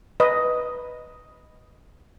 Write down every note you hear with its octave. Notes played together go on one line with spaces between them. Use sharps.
B4 D#5